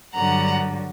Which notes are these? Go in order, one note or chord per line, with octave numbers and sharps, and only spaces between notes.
G2 D3 F#3 F#5 A#5